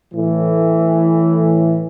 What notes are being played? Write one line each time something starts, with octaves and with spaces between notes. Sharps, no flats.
A2 E3